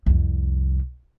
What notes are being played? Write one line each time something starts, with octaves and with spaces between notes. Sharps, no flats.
C2 F2